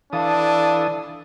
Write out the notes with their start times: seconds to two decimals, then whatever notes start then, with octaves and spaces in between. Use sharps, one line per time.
0.13 E3 D4 A4 F5 D#6